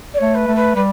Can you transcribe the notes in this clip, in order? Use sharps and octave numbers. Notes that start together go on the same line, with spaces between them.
D5
A3 C#5
B4
A3
B4
G3 B4